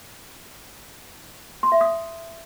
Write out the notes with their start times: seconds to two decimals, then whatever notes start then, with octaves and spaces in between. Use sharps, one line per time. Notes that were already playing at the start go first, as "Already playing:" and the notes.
1.63 C6
1.72 E5
1.81 D#6